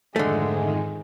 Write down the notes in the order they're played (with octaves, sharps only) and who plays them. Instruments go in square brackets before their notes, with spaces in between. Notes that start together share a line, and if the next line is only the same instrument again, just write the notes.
[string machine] F2 G#2 D#3 [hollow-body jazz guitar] D3 A3 [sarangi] G#3